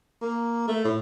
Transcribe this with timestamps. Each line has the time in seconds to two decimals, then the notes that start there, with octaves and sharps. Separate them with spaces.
0.22 A#3
0.68 A3
0.85 A2